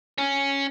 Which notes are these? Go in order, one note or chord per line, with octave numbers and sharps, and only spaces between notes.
C#4